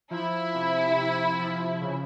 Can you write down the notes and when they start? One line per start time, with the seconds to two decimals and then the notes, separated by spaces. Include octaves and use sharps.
0.11 F3 E4
0.55 C3
0.96 C3
1.40 F3
1.82 C#3